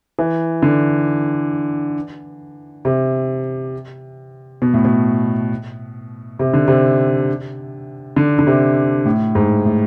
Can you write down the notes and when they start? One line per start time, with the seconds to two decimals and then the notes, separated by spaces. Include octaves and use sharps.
0.19 E3
0.63 D3
2.85 C3
4.62 B2
4.74 A2
4.85 B2
6.39 C3
6.54 D3
6.68 C3
8.16 D3
8.39 D3
8.47 C3
9.06 A2
9.35 G#2
9.65 A2